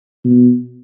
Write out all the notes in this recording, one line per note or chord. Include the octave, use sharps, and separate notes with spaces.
B2